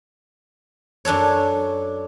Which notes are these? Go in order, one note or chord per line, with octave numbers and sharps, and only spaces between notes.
F#2 D4 A4 C#5